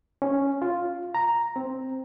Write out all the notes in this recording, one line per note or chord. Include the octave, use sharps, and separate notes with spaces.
C#4
F4
A#5
C4